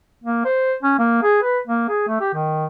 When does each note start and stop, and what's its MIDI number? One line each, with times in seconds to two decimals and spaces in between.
0.24 0.44 58
0.45 0.73 72
0.83 0.94 61
0.99 1.18 58
1.23 1.38 68
1.42 1.59 71
1.68 1.84 58
1.89 2.07 68
2.08 2.20 57
2.21 2.31 67
2.34 2.66 51